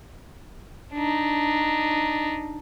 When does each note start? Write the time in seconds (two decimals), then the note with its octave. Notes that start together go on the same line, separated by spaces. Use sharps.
0.93 D4 D#4